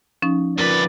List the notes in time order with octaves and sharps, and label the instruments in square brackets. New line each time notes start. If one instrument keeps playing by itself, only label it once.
[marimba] F3 C#4 D#4
[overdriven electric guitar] F2 B4 [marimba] F4 A#4 [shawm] D5